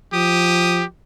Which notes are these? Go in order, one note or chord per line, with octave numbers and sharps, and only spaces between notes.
F3 G4 D#6